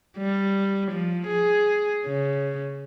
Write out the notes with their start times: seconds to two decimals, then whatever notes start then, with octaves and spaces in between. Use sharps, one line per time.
0.18 G3
0.92 F3
1.27 G#4
2.06 C#3